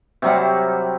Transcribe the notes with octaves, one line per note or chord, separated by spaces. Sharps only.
C3 F#3 G3